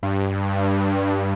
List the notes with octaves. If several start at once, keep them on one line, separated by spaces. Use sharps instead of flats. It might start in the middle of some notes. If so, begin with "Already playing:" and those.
G2